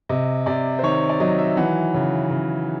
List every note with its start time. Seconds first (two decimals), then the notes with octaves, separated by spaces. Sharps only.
0.09 C3 D#5
0.46 C3 D5
0.79 C5
0.83 D#3 C#5
1.09 D5
1.20 F#3 D#5
1.39 E5
1.57 E3 F#5
1.94 C#3
2.31 C#3